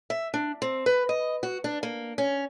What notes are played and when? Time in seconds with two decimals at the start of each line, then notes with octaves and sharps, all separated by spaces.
0.10 E5
0.34 D4
0.62 C4
0.86 B4
1.09 D#5
1.43 F#4
1.64 D4
1.83 A#3
2.18 C#4